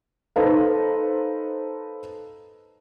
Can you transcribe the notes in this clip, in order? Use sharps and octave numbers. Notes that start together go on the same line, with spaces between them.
D#4 A4 B4 C5 F5